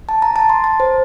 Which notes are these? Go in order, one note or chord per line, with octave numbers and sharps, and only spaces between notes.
A5
A#5
A5
C6
A5
C5